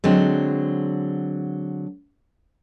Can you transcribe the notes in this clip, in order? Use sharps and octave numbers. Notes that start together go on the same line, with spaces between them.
D3 F#3 G#3 C4